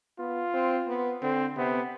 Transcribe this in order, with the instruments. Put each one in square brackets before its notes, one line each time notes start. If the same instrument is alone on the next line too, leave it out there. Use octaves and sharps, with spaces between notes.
[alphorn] B3 [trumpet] F4
[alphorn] C4
B3
[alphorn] D3 [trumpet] C4
[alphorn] C3 [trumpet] B3